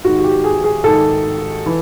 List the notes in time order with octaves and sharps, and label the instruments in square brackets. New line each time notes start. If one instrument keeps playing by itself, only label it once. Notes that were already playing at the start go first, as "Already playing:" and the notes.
[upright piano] G#2 D#3 F#4
F#4
G4
G#4
G#4
G#2 D#3 A4
E3